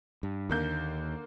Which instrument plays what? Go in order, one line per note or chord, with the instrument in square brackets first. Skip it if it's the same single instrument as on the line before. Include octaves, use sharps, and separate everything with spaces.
[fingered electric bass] G2
[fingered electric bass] D#2 [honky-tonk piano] D3 A#3 G6